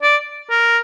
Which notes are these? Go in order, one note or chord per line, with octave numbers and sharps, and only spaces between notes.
D5
A#4